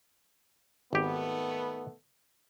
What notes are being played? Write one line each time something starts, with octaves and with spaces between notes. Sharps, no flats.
G#1 D#3 A3 B3 G4